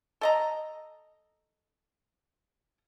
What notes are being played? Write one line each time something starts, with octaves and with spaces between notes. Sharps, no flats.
A4 D#5 A#5